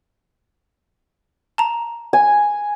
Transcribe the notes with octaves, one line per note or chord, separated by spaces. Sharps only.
A5 A#5
G#5